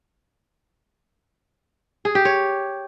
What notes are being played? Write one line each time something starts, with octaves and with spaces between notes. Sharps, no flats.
G#4
G4
C#5